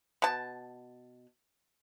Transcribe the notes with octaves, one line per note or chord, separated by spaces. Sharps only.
B2 A5